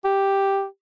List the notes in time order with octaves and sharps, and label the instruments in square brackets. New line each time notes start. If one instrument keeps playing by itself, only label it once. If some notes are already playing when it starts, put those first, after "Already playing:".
[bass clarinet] G4